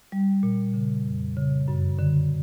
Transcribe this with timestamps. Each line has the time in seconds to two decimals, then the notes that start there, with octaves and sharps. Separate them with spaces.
0.12 G3
0.43 A#2
0.74 C#3
1.05 F2
1.37 C#3
1.68 F#2
1.99 D3